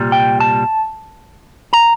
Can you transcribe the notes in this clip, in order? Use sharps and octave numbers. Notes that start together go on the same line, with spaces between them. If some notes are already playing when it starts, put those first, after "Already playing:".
Already playing: C2 A#2 G3
G5
A5
A#5